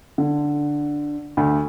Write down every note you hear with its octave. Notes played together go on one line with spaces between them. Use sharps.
D3
D2